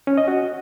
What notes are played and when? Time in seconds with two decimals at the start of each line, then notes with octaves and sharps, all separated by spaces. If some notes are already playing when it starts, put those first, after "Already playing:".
0.07 C#4
0.17 D#5
0.28 F#4